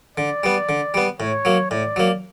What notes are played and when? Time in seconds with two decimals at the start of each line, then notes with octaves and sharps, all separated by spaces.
0.17 D3 D5
0.43 G3 B3
0.69 D3
0.94 G3 B3
1.20 A2 C#5
1.45 F#3 A#3
1.71 A2 D5
1.96 F#3 A#3